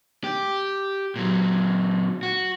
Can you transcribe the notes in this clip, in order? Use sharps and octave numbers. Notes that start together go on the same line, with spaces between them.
G4
A#2 F#3
F#4